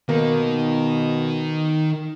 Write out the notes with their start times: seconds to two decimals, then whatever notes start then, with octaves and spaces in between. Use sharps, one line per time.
0.09 B2 D#3 A#3